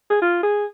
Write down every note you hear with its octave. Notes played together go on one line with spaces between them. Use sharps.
G#4
F4
G#4